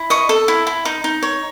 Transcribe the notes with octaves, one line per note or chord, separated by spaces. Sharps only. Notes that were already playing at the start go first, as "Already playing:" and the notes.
Already playing: E4
D#5 C#6
A4
E4
E4
D#4
D#4
C#5